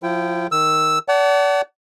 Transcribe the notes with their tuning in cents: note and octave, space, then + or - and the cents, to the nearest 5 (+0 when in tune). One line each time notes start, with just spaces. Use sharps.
F3 +25 E4 +45 G5 -5
D#3 +0 E6 +0
D5 -35 F#5 +35 A5 +0